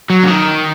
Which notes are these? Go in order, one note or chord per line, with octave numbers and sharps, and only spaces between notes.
F#3
C#3
D#3